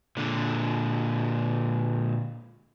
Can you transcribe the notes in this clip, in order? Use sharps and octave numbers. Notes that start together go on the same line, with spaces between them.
A#2 D3